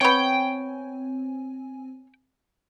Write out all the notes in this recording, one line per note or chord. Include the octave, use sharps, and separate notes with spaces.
B3 C4 C#5 G5 G#5